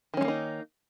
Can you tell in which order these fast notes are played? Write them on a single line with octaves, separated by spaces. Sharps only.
D#3 C#4 G#3 A#3 D#4